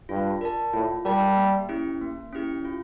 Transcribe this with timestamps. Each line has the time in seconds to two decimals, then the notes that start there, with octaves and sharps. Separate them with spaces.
0.09 G2 F4
0.41 A#4 D5 A5
0.73 A2 F4
1.05 G3 A#4 D5 A5
1.37 A#3
1.69 C#4 E4 G4
2.01 A#3
2.33 C#4 E4 G4
2.65 F4